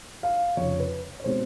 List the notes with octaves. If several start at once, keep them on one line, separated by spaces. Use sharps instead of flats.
F5
F1 F2 C#3 C#5
B4
C#5
B2 G#3 C4 C5